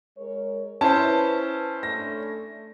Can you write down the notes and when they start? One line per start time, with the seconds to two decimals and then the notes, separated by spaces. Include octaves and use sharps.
0.17 G#3 A#4 C#5
0.81 C#4 E4 B4 C5 A5
1.83 A3 D4 A#6